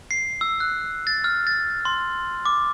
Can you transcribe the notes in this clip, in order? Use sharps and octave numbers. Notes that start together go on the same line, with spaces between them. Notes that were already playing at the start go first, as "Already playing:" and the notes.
C7
E6
F#6
A6
F6
A6
C6
D6